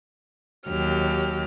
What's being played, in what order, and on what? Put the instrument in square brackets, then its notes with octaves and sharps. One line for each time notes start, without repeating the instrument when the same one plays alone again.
[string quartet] D#2 F#3 G4 F6